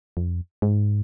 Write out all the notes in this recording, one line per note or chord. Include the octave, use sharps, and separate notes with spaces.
F2
G#2